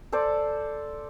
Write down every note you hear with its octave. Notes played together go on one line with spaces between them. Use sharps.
A4 C5 D5